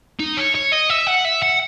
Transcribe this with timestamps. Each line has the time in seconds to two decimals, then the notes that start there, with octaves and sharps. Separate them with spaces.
0.19 D#4
0.37 C#5
0.55 C#5
0.72 D#5
0.90 E5
1.07 F#5
1.25 E5
1.43 F#5